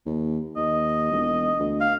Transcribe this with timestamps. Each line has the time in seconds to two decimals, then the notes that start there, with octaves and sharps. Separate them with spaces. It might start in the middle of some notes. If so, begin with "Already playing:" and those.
0.06 D#2
0.57 D#2 D#5
1.11 E1
1.59 D2
1.80 F5